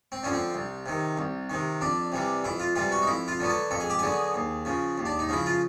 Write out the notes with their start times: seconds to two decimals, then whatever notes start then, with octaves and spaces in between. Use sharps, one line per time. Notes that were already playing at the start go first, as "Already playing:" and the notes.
0.12 C4
0.23 D3 F3 C#4
0.33 C4
0.54 C2
0.86 C3 D#3
1.17 C2
1.50 C3 D#3
1.81 F2 D4
2.12 C3 E3 G3
2.44 F2 E4
2.60 F4
2.75 C3 E3 G3 F4
2.92 F#4
3.02 D#4
3.07 F2 E4
3.28 F4
3.39 D3 F#3 B3
3.50 A4
3.71 F2 A4
3.80 G#4
3.90 G4
3.99 D3 F#3 B3 G#4
4.34 D#2
4.65 C#3 F3
4.98 D#2
5.05 D4
5.19 D#4
5.29 C#3 F3 E4
5.46 F4